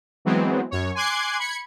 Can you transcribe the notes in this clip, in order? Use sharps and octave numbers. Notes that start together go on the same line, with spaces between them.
E3 F#3 G#3 B3 C4
F#2 C#5
G#5 C6 D6 F#6 G#6 C7
B5 G#6 C#7